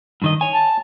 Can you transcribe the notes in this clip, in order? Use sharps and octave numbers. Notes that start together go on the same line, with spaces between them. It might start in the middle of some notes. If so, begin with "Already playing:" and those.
G2 D#3 D#5
C#5 G#5
A5